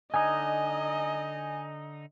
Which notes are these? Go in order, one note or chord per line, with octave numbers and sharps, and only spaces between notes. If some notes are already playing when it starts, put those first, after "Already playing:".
D3 D#4 D#5 G#5